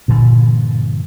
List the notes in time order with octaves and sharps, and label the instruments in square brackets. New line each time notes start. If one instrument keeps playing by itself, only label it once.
[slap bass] G2 A#2 D3 E3